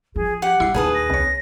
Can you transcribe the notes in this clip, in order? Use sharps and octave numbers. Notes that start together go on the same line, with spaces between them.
F3 G#4
G4 F#5
G2 E4 C7
A#1 D#2 G#4 B4 A5 D#6
A#6
C2 C#5